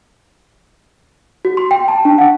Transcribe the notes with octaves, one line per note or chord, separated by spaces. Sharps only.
F#4
C6
G5
A5
D4
F#5